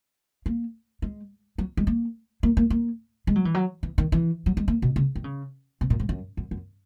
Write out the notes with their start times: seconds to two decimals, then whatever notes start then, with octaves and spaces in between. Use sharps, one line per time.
0.46 A#3
1.02 G#3
1.58 F#3
1.77 G#3
1.87 A#3
2.43 A#3
2.57 A#3
2.70 A#3
3.27 G#3
3.36 F#3
3.45 E3
3.54 F#3
3.83 E3
3.98 D#3
4.12 E3
4.46 F#3
4.57 G#3
4.68 A#3
4.82 B2
4.96 C#3
5.16 D#3
5.24 C#3
5.81 B2
5.90 A#2
6.00 G#2
6.09 F#2
6.37 F#2
6.51 F#2